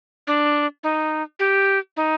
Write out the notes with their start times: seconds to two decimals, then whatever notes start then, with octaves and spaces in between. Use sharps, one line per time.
0.27 D4
0.83 D#4
1.39 G4
1.97 D#4